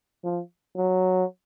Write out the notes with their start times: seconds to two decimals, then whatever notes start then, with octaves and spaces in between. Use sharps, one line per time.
0.24 F3
0.77 F#3